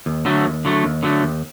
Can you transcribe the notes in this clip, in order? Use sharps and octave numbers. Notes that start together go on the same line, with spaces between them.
D#2
D3 F#3 A3
D#2
D3 F#3 A3
D#2
D3 F#3 A3
D#2